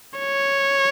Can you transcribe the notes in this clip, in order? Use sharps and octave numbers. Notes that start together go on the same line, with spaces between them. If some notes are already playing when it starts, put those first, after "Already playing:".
C#5